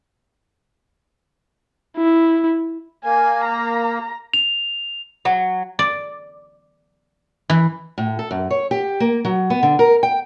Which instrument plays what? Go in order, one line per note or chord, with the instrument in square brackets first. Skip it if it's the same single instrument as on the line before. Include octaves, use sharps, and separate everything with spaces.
[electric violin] E4
[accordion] A#3 [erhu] G#5
[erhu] A#5
[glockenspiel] F7
[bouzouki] F#3
[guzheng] D5
E3
[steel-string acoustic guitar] A2
A4
F#2
C#5
G4
A#3
F#3
B3
D3
A#4
G5